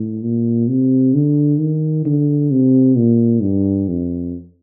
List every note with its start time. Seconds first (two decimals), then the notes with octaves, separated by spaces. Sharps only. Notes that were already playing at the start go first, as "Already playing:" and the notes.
Already playing: A2
0.23 A#2
0.68 C3
1.14 D3
1.59 D#3
2.05 D3
2.52 C3
2.97 A#2
3.42 G2
3.88 F2